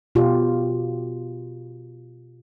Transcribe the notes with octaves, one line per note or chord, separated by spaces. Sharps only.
B2 F4 G4